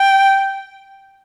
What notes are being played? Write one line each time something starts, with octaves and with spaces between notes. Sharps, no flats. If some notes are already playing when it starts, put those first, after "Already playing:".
Already playing: G5